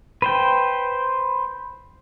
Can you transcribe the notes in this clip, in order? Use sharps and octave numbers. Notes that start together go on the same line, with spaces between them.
B4 C5 G5